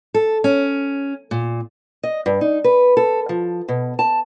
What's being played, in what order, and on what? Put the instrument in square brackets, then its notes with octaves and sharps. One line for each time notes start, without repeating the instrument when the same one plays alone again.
[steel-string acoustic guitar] A4
C#4
A#2
D#5
G2
D#4
B4
A4
F3
B2
A5